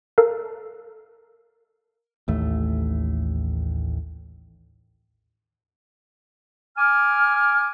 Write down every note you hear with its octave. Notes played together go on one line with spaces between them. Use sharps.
A4 A#4 F5
A1 D#2 A3
G#5 D6 F6